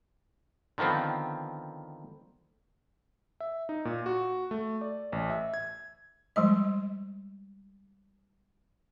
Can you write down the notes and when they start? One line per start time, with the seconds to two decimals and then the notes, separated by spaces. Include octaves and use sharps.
0.78 D3 D#3 F3 B3 C4
3.40 E5
3.69 D#4
3.85 A#2
4.06 F#4
4.51 A3
4.81 D5
5.12 A1
5.30 E5
5.54 G#6
6.36 F3 G3 G#3 D#5